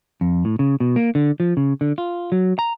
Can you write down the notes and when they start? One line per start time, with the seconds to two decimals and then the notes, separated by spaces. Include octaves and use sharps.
0.21 F2
0.45 A2
0.59 C#3
0.80 B2
0.96 A#3
1.15 D3
1.40 F3
1.57 C#3
1.81 D3
1.98 F4
2.32 F#3
2.59 A#5